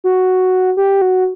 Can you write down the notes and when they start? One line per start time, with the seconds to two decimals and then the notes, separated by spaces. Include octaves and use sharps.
0.04 F#4
0.77 G4
1.02 F#4